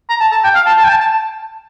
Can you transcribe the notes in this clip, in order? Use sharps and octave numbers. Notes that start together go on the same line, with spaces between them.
A#5
A5
A5
G5
F5
A5
A5
G5
A5
A5